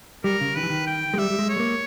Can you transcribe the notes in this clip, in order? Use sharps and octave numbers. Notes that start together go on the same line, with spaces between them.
G3 A#4
C#3
D#3 B4
E3
D#3
G5
G#3
G3 E5
G3
G#3
C#5
G#3
A#3